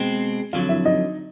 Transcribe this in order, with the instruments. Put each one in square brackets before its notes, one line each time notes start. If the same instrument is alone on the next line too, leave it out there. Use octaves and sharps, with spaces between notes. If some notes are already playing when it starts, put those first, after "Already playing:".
Already playing: [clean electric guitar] B2 G#3 C4
[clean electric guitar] F2 D3 F#3 [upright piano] F4 F5
[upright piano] E4 E5
D#4 D#5